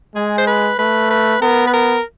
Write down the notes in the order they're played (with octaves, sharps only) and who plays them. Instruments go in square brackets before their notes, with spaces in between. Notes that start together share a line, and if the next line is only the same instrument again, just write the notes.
[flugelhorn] G#3 [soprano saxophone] G#4
[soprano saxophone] C5
B4
[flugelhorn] A3 [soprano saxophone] B4
[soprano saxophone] B4
[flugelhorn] B3 [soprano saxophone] A#4
[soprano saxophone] B4
A#4